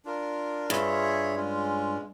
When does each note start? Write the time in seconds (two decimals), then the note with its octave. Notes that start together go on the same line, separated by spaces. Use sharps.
0.05 D4 F4 A#4
0.70 G2 F4 G#4 C#5 E5
1.36 G#3 C#4 F4